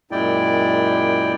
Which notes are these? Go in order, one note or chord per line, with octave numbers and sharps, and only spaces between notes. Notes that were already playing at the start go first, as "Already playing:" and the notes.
F#2 A#2 G#3 E4 D5 G5